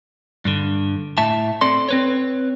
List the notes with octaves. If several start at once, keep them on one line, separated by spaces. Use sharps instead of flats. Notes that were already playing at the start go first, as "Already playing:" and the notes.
G2 D3
A2 E5 A5
C4 A4 D5 C6
C4 B4 C#5